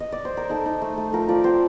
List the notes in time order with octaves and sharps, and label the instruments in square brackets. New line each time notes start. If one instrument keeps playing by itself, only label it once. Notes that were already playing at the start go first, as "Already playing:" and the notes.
[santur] D#5
D5
C5
A#4
D#4 A4
D#4
A3
A3
F3 A#4
F3 D5
C4 C5